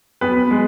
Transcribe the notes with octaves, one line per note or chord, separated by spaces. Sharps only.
B3 B4
G#3